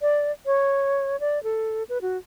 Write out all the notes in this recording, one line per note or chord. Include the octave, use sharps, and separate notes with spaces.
D5
C#5
D5
A4
B4
F#4